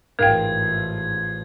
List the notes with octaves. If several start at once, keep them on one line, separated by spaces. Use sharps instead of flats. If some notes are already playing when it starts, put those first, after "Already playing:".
A1 G#2 F3 A#4 F5 G5 G#6